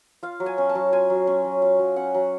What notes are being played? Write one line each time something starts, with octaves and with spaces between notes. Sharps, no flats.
F4 F5
F#3
G#5
C#4
A5
F#3
F4 G#5
F#3
C#4
F#3
F4 F5
F#3
C#4 F#5
F#3